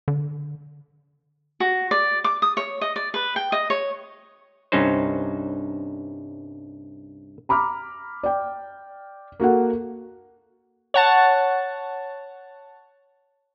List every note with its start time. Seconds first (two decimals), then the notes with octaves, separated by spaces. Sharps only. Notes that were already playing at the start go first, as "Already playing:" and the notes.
0.08 D3
1.60 F#4
1.91 D5
2.24 D6
2.42 D#6
2.57 C#5
2.81 D#5
2.96 D5
3.14 B4
3.36 G5
3.52 D#5
3.70 C#5
4.72 C2 G2 C#4 D#4 C5
7.49 A#5 B5 D6 F6
8.23 D5 G5
9.40 A#3 F#4 A4 F#5
10.94 C#5 F#5 A5